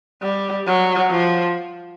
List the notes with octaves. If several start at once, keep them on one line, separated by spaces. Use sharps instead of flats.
G3
F#3
F3